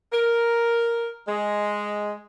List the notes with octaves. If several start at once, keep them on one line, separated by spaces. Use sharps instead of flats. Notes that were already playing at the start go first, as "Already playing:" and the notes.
A#4
G#3